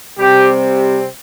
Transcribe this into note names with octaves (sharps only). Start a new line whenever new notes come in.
C3 G3 C4 G4